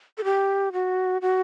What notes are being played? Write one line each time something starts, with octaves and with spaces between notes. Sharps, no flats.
A4
G4
F#4
F#4